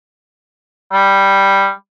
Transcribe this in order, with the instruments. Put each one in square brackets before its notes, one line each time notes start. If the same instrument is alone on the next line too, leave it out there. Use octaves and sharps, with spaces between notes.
[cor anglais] G3